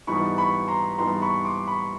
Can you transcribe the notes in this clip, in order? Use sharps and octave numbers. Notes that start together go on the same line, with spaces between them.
G#2 E3 G3 B3 D#4 B5 C#6
B5 C#6
A#5 C6
G#2 E3 G3 B3 D#4 A#5 C6
B5 C#6
C6 D6
B5 C#6